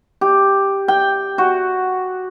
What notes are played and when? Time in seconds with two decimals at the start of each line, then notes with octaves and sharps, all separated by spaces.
0.21 G4
0.88 G5
1.38 F#4